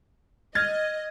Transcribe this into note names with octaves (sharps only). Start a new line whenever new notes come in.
D#5 F6 G#6 A6